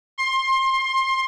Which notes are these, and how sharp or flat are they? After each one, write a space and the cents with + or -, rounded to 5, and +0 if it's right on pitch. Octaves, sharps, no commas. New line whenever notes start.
C6 +25